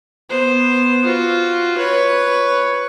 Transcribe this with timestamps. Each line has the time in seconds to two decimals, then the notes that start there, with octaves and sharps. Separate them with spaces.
0.30 B3 C5
1.05 F4 F#4
1.77 B4 C#5